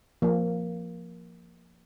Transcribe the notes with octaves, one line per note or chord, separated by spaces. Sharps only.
F3 A#3